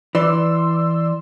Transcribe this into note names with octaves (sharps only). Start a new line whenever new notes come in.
E3 D5 C6 E6